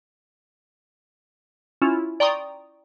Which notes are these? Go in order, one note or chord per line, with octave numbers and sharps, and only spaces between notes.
C#4 E4 F4
D5 G5 A#5 C6 C#6 D#6